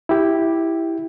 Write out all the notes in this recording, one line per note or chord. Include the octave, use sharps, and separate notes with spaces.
E4 G4